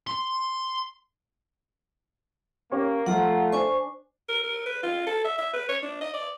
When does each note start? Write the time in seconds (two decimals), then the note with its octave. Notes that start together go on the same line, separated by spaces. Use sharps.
0.07 C6
2.72 A#3 C#4 G4 C#6
3.06 F3 A3 F4 F#5 A#5
3.53 D4 C5 G#5 C#6
4.29 A#4
4.44 A#4
4.66 B4
4.83 F4
5.07 A4
5.24 E5
5.38 E5
5.53 B4
5.69 C#5
5.83 D4
6.01 D#5
6.13 D5